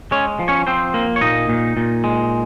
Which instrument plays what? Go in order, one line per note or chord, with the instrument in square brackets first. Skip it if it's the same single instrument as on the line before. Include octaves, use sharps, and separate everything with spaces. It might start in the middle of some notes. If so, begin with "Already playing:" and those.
[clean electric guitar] G#3 C#4 C#5
F3
C#4 C#5
F3 C4 C5
A#3
C#5
A#2 D#4 D#5
A#2
A#2
G#3